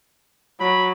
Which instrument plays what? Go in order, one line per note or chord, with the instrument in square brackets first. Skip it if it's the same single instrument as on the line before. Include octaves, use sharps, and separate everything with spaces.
[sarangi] F#3 [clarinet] B5